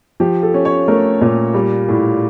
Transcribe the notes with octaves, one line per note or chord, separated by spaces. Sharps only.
F3 G4
A4
C#4
C#5
A3 A#4
A#2
G3
A2